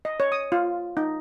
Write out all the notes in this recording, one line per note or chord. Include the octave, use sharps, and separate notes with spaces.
D#5
C#5
D#6
F4
D#4